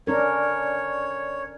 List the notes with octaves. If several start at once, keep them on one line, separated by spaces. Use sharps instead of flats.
C#4 D4 A#4 C#5